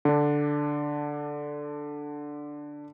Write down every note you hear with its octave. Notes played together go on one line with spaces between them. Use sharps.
D3 D4